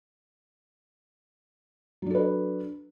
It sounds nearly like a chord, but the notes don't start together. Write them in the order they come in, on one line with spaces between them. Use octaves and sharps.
F#3 D4 A4 B4